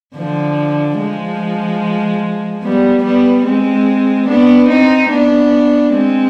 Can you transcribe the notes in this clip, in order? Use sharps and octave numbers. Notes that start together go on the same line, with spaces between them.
D3 F3
F3 G#3
G3 B3
G3 B3
G#3 C4
B3 D4
C4 D#4
B3 D4
G#3 C4